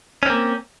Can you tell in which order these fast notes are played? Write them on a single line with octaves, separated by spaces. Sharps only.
C#4 C4 A#3